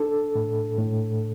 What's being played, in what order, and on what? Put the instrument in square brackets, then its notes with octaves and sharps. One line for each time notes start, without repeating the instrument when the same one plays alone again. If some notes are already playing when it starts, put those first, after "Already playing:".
Already playing: [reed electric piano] D4 A4
A2
A2